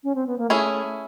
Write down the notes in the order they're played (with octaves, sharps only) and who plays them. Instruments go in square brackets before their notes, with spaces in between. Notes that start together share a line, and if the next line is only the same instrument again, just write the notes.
[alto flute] C#4
C4
B3
A#3
[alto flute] A3 [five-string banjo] C#4 E4 G#4